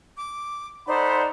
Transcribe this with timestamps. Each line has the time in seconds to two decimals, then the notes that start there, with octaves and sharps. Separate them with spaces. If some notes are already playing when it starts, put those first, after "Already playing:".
0.17 D6
0.88 D#4 A4 C5 D5 F#5 B5